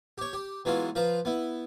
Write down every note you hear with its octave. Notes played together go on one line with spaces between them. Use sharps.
G4 C#5
G4
E3 F#3 G#3 B3 E4 F4
F3 F4 B4 A#5
B3 E4